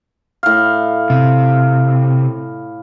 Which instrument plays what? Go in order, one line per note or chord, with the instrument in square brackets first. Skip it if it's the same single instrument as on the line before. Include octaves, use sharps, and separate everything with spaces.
[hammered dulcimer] A2 F5
[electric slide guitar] C3